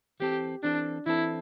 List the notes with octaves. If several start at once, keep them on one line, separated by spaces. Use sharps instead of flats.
E3 C4 G4 A4
E3 C4 D4 A4
E3 C4 E4 A4